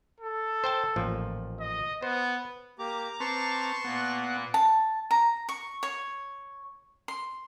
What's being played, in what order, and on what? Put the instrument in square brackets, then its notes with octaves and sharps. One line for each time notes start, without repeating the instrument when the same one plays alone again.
[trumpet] A4
[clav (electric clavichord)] C5 G5 A5
A1 A#2 F3
[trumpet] D#5
[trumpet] B3 [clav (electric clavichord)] C5
[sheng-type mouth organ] A#3 G4 [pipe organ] A#5 D6
[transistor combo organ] C4 B4 [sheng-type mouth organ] A5 C6 C#6
[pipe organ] A#2 A#3 F#6 [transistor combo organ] B3 F#5
[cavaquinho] A5
A#5
C#6
C#5
C6